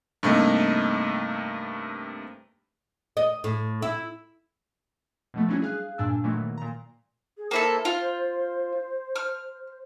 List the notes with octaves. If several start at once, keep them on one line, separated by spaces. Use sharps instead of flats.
G2 C3 A3 A#3 D#4
D#5
A2
E4
B2 F3 A3
F#3 G3 C#4 D4 E4
G#4 F5 F#6
G2 A#2 D4 G#5 E6
A#2 D#3 E3 F#3 A3
A#2 A#5
G#4
A#3 E4 A4 C5
F4
F6